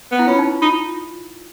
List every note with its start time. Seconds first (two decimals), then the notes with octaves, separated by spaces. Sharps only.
0.11 B3
0.19 E4
0.27 C#4 F4
0.39 D#4
0.62 D#4 F4